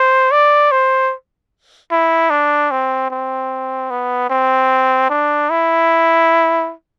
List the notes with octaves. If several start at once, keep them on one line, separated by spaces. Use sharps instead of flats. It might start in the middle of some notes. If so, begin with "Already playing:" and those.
Already playing: C5
D5
C5
E4
D4
C4
C4
B3
C4
D4
E4